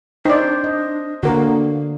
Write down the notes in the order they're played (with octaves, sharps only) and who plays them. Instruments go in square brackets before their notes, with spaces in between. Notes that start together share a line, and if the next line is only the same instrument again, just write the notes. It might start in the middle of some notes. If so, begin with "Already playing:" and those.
[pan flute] D4 [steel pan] D#4 D5 [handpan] C5
[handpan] D#5
[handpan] D3 [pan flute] A#3 [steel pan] F#4 A#4